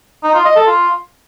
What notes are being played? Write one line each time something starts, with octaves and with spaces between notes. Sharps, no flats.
D#4
F4
D#5
A4
F4